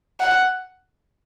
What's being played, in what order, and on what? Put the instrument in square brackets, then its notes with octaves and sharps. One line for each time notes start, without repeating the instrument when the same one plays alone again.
[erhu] F#5